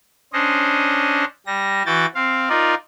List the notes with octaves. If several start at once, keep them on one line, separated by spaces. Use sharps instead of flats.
C#4 D4 C5 D#5
G3 A#6
E3 F#4 G5 A6
C4 F5
D#4 F4 A#4 D5